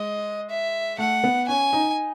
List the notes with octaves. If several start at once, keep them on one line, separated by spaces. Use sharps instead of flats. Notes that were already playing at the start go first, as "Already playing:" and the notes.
Already playing: G#3 D#5
E5
A3 F#5
B3
C#4 G#5
D#4